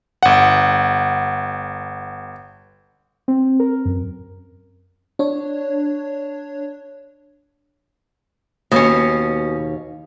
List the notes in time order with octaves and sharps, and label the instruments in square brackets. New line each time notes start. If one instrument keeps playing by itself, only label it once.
[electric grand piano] G1 F#5
[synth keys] C4
A#4
F#2
[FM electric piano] D4 C#5
[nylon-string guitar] D#2 [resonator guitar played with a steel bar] B2 C#4